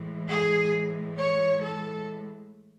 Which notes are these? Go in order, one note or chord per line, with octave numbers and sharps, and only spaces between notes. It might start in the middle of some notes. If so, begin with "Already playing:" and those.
Already playing: A2 E3 G#3
G#4
C#5
A4